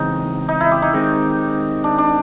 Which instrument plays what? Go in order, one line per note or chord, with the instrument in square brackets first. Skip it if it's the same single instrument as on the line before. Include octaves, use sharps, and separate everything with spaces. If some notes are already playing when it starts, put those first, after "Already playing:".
Already playing: [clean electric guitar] E2 C#3 E3 G#3 C4 [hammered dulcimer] D#4
[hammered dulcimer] D#4
E4
G4
D#4
[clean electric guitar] D#3 G#3 C4
[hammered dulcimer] D4
D4